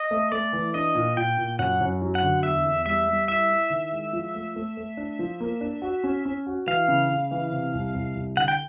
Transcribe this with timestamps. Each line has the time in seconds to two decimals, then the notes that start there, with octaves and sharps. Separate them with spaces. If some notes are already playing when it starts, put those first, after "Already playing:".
Already playing: D#5
0.11 A3
0.32 A3 D5
0.53 E3
0.74 D4 D#5
0.95 A#2
1.17 A#2 G5
1.37 A#2
1.59 F#2 F#5
1.80 F#2
2.02 F#3
2.15 F#5
2.22 D3
2.43 E2 E5
2.65 E2
2.86 G3 E5
3.07 G3
3.28 E4 E5
3.50 E4
3.70 D#3
3.92 G#3
4.13 F3
4.35 A3
4.56 A3
4.77 A3
4.97 D4
5.19 F3
5.40 A#3
5.61 D4
5.82 F#4
6.04 C#4
6.25 C#4
6.46 F#4
6.67 E3 F5
6.88 C#3
7.10 C#3
7.31 E3
7.52 C3
7.74 C2
7.94 C2
8.15 C2
8.37 D3 F#5
8.48 G5